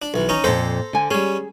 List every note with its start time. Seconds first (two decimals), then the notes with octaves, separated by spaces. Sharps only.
0.02 D4
0.14 B1 E3
0.29 C#4 D#4 A#5
0.44 F2 A#2 A4 C5 A#5
0.93 D3 G#5
1.11 G3 C#4 G#4